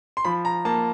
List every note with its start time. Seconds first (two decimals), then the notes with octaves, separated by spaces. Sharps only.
0.17 C6
0.25 F3 B5
0.45 A#5
0.65 A#3 A5